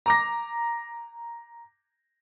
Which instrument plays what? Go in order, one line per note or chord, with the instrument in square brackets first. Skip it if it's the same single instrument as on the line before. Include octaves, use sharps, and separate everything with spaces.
[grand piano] A#5 D6 A#6